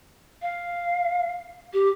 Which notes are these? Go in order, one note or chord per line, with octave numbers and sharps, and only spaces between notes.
F5
G4